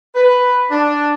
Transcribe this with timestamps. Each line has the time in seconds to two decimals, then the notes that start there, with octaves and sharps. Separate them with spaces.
0.14 B4
0.71 D4